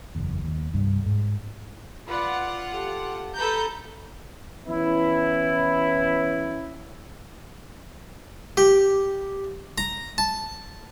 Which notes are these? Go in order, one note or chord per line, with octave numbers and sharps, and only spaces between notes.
F#1 E2
D#2
C2 G2 D4
G#2
F4 B4 D5 F#5
G4 A4
A4 B4 A#5 G6
E3 B3 C#4 E4
G4
A#5
A5